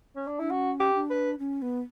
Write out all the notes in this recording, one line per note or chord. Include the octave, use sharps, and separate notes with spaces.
C#4
D4
D4 E4
C#4 F#4
G4
D4
B4
C#4
B3